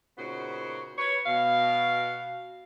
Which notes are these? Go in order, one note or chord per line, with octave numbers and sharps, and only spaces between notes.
A#2 C#3 B3 D#4 F#4 C5
B4 C#5
B2 F5